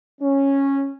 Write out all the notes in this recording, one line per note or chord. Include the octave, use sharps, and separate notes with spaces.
C#4